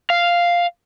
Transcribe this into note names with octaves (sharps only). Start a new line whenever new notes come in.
F5